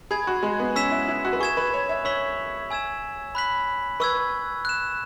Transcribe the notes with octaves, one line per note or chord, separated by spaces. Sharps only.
G#4 G#5 B5 G#6
F#4
G#3
B3
C#4 E6 B6 E7
E4
E4
F#4
B4
G#4 C#6 G#6 E7
B4
C#5
E5
C#5 C#6 E6 B6 F#7
G#5 E6 G#6 E7
B5 F#6 B6 F#7
B4 C#6 E6 G#6
F#6 E7